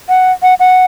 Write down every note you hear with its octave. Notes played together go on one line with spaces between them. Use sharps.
F#5
F#5
F#5